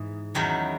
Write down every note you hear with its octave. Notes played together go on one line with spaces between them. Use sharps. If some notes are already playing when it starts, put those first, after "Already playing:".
Already playing: G#2 E3
E2 D#3 F#3 C#4 E4